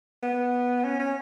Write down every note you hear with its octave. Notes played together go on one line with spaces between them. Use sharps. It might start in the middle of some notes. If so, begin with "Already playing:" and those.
B3
C#4
C#4